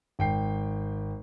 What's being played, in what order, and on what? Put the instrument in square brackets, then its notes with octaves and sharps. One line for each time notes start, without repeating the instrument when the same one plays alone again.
[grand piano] G#1 G5 C7